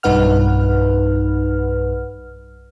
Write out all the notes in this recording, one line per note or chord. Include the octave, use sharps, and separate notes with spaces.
B1 G2 D#4 B4 F#5 F6